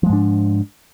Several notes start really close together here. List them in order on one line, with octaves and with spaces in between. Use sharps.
F3 G#3 G#2 D4